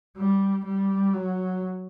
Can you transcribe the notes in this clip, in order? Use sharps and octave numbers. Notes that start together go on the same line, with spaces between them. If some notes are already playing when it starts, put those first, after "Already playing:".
G3
G3
F#3